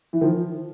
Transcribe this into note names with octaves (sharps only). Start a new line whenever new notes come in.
E3
D#3 F3